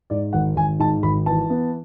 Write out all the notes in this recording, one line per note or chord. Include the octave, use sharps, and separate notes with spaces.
G#2 D5
G#1 F#5
G#1 G#5
G#2 A5
G#1 B5
E3 A5
B3